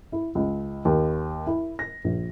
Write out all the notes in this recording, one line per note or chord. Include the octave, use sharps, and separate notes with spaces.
E4
C#2
D#2
E4
A#6
A#1